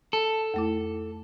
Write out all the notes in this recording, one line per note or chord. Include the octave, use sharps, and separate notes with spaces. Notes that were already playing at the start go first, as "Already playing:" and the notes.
A4
F2 A3 E4